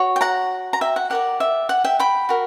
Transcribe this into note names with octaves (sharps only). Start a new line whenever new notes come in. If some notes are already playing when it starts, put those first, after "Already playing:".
Already playing: F#4 C#5
G5
F#5 A#5
A#5
E5 G5
F#5
G4 A#4 D5 F#5
E5
F#5
E5 G5
G5 B5
F#4 A#4